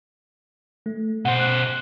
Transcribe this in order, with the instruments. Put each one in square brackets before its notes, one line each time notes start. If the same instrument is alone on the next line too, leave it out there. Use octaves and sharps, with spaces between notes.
[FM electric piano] A3
[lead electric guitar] B2 C5 [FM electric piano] F#5
[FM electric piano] F#6